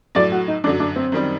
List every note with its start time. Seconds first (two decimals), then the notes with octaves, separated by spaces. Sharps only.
0.15 A2 F#3 A3 D5
0.32 F#4
0.48 D#4
0.64 F#2 D4
0.67 D3 F#3
0.80 D4
0.96 C4
1.12 F#2 D#3 G3